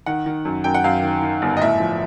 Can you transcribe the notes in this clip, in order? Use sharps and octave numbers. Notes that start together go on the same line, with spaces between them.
D#3 F#5
D#3
F#2
F#2 G5
F#5
F#2 F5
D#3
D#3
G1
D#5
A2 E5
F3